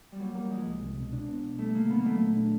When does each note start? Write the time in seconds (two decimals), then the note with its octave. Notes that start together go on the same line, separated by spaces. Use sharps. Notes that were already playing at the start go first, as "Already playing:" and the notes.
0.12 G3
0.19 F#3 A#3
0.35 G3 A#3
0.51 F3 G#3
0.67 C2
0.81 C2
0.97 B2
1.13 D4
1.29 B3
1.43 B2
1.59 G3 A3
1.75 D3 A#3
1.90 D3 B3
1.99 A#3
2.06 F#3 A3
2.21 A#2
2.37 D4